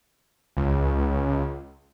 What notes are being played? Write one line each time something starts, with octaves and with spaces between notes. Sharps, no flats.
C#2